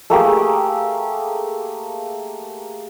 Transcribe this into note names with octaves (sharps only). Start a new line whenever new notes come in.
A3 A#3 G4 G#4